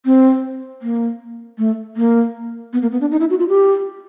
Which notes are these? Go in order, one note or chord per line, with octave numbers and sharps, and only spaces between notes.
C4
A#3
A3
A#3
B3
A#3
B3
D4
D#4
E4
F#4
F4
G4